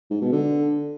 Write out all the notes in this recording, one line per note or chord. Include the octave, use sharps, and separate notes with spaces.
G#2
B2
D3